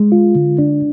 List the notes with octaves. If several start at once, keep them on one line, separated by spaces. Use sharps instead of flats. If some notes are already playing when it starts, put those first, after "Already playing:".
Already playing: G#3
F4
D3
D4